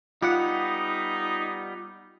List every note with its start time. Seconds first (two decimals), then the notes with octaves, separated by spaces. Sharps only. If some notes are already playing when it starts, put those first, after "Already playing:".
0.22 G3 B3 D#4 F4 F#5